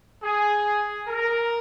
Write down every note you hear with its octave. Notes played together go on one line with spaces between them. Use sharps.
G#4
A#4